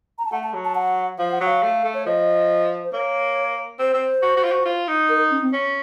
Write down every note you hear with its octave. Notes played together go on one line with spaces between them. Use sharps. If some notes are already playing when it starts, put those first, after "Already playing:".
A#5
A5
A3 F#5
A5
F#3
A5
F#5
F3 F5
F#5
F#3 F5
A3
A3
C#5
F3 D#5
C5
A#3 C#5
C4 C5
C4
F#4
F#4
F4
F#4
F4
D#4
A#4
C#4
C4
C#4